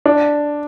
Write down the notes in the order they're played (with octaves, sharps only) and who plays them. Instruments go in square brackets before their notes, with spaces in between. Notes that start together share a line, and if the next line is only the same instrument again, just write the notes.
[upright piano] D4